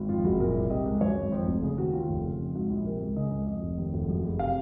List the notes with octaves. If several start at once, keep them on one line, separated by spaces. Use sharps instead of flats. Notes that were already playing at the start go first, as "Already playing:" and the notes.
Already playing: G#1
F2 F4
F#1 F#4
A#2 A#4
C2
C3 D#5
C#2
F#2 C#5
G#1
F2 C5
F1
C#3 G#4
D#2 F#4
D#2 F4
F1
C#3
F2
G#2 F#4
A#1
C3 A#4
C#2
C#3 D#5
C#2
F2 D#5
F1
D#2
F1
F#2
F#1
C3 F5